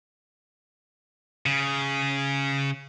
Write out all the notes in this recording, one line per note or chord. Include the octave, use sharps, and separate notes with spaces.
C#3